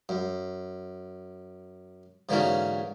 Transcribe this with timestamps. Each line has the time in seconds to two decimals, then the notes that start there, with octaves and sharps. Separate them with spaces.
0.09 F#2
2.29 G#2 D3 E3 A#3 C#4 F#4